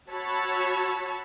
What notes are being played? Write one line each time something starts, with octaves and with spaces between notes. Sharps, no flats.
F#4 C#5 A5 B5 E6